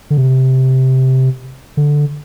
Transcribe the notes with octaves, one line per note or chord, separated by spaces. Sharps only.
D3
C3
D3